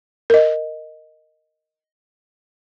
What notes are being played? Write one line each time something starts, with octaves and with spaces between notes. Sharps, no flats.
A#4 D#5